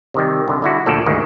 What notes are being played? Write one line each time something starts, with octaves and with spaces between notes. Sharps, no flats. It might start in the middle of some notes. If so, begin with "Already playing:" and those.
C3 D#3 G3
C2 D3
D3 E4 F#4
D2 A#2 F3 A4 D5
D2 G#2 D#3